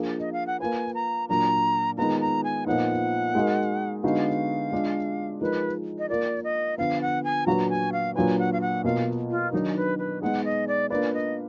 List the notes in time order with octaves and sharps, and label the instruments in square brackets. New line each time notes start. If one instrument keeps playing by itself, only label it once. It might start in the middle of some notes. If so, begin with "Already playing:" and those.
Already playing: [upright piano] F3 A#3 D4 G#4
[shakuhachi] D#5
F5
F#5
[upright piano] A#3 F4 B4 [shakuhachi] G#5
[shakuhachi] A#5
[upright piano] A#2 F#3 A#3 D4 [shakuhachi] A#5
[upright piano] D#3 G#3 B3 F4 [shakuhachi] A#5
[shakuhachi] A#5
G#5
[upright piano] A#2 F3 B3 D#4 [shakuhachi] F#5
[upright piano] G#3 D#4 F#4 A#4
[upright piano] D3 G#3 B3 D#4 F#4 [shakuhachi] F5
[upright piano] G#3 D4 F4
[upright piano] F3 G#3 D#4 A#4 [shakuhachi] B4
[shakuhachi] D#5
[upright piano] A#3 F4 A#4 [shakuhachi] D5
[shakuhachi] D#5
[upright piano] D3 F3 B3 [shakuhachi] F5
[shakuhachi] F#5
G#5
[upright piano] A#2 F#3 D4 F#4 B4 [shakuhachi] A#5
[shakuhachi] G#5
F5
[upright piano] A#2 F#3 D4 F4 B4 [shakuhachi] G#5
[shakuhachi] F#5
F5
F#5
[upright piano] B2 A#3 F4 [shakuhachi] F5
[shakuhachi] F4
[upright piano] D#3 F#3 D4 [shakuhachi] D#4
[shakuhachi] B4
B4
[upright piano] G#3 B3 D#4 G#4 [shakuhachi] F#5
[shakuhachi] D#5
D5
[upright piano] A#3 D4 F4 B4 [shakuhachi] D5
[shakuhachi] D#5